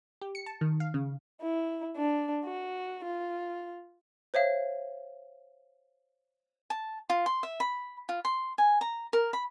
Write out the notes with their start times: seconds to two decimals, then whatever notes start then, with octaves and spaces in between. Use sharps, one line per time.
0.22 G4
0.35 C#7
0.46 A5
0.61 D#3
0.80 F5
0.94 C#3
1.42 E4
1.97 D4
2.45 F#4
3.04 F4
4.34 C5 C#5 E5 F5
6.70 A5
7.10 F4
7.26 C6
7.43 E5
7.60 B5
8.09 F4
8.25 C6
8.58 G#5
8.81 A#5
9.13 A#4
9.33 B5